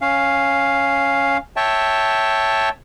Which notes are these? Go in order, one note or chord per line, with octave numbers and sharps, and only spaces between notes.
C#4 F5
C#5 E5 G5 A5